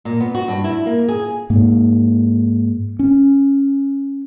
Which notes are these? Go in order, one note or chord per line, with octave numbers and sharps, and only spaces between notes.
A#2
B3
F#4
G2
E4
A#3
G#4
G#2 A#3
C#4